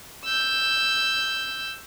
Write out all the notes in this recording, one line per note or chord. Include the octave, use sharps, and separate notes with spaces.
E6 G6